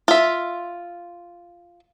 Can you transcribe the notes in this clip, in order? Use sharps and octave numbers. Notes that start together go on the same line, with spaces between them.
F4 E5